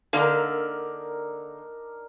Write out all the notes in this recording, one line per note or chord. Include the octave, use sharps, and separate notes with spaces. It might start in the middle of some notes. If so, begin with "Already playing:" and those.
D3 A#3 D4 D#4 A#4